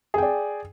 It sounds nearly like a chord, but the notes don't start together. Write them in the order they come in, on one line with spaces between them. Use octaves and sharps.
G#4 G5 D5